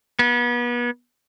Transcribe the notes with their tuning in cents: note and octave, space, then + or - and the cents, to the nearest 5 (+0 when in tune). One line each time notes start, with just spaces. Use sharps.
B3 -35